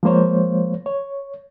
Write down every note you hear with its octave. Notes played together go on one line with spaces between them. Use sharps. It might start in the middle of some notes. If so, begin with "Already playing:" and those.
F3 G#3 A#3 C5 C#5
C#5